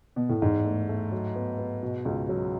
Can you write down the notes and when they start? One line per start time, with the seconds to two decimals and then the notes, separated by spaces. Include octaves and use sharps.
0.16 B2
0.29 A2
0.42 E2 G#2
0.65 A3
0.89 A3
1.12 F#3
1.36 B3
1.58 B3
1.83 B2
2.05 C#2
2.29 F#3